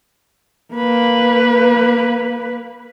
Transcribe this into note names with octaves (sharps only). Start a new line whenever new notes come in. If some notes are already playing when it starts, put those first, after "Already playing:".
A#3 B4